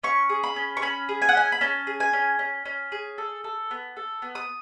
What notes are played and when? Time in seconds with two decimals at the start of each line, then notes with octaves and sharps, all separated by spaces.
0.03 C#4 C#6
0.29 G#4
0.43 B5
0.56 C#4
0.77 C#6
0.82 C#4 B5
1.09 G#4
1.22 G#5
1.29 F#5
1.35 C#4 G#5
1.52 B5
1.61 C#4 A5
1.87 G#4
2.00 G#5
2.13 C#4
2.39 C#4
2.66 C#4
2.92 G#4
3.18 A4
3.44 A4
3.71 B3
3.97 A4
4.22 B3
4.35 D#6